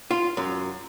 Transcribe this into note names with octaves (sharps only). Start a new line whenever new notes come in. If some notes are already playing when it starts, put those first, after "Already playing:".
F4
F#2